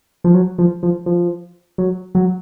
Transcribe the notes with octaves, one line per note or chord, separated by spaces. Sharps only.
F3
F#3
F3
F3
F3
F#3
F#3